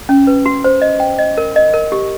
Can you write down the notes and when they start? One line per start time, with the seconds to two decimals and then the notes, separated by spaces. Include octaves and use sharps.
0.09 C#4
0.27 B4
0.46 F#4
0.64 C5
0.82 D#5
1.00 G5
1.19 D#5
1.38 A#4
1.56 D#5
1.74 A#4
1.92 G4